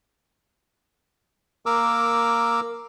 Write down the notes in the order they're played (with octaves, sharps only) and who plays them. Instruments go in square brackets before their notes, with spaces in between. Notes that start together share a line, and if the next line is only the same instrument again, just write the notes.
[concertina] A#3 A#4 D6 E6